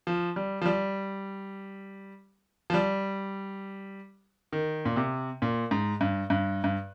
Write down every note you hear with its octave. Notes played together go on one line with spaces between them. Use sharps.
F3
G3
F3
G3
F3
G3
D#3
A#2
C3
A#2
G#2
G2
G2
G2